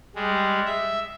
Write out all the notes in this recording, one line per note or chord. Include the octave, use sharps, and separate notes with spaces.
G3 G#3
E5